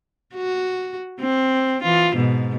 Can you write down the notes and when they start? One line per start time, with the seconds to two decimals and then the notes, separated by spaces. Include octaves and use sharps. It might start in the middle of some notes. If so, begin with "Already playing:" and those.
0.35 F#4
1.20 C4
1.83 E3 F4
2.15 G#2 B2